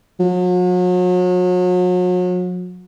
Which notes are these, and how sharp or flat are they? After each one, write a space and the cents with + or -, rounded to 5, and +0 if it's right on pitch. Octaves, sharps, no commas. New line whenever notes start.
F#3 -40